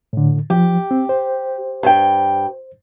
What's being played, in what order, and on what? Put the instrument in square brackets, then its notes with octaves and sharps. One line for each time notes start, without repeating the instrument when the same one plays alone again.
[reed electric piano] A2 D3
[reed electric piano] F3 [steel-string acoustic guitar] G4
[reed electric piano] C4
C5
[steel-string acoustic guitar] G2 G5